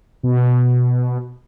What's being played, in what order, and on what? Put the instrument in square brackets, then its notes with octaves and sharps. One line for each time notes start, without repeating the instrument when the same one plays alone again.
[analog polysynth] B2